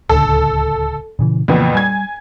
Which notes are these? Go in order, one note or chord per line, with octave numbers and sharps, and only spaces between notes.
D1 C#2 D3 A4
A#2 C#3 E3
F2 A#2 C#3 E3 B3
G3 G#5 G#6